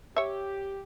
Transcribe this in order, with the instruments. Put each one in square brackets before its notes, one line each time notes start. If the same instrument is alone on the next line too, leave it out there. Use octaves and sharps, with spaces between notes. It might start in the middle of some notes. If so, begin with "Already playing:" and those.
[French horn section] G4 [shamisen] C#5 E5